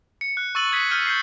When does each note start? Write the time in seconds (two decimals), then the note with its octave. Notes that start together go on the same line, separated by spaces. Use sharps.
0.21 C#7
0.37 F#6
0.55 C#6 E6 A6 D#7 F#7
0.71 D#6 G#6 B6
0.91 F6 G6 C#7 D#7
1.06 G6 A6 C7